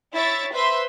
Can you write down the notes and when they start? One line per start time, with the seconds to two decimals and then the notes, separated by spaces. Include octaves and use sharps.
0.13 E4 C#5 E5 A6
0.53 B4 C5 E5 C6